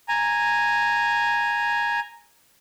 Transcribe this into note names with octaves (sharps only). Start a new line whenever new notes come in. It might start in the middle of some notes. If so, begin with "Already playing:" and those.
G#5 A#5